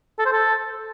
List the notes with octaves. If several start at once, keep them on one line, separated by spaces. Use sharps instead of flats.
A4
C5
A4